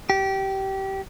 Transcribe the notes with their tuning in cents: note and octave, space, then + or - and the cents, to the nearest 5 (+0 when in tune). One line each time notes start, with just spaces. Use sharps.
G4 -20